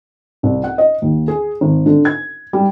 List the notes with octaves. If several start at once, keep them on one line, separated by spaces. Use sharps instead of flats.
C2
F#5
D#5
D#2
G#4
G#1
D3
G#6
G3